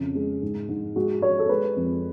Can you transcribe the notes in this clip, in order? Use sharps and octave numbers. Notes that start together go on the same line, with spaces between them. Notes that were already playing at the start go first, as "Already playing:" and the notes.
Already playing: F2 C#3
G#3
G#2
G#2
G#3 F#4
G#3 C#5
A4
G#3 B4
F2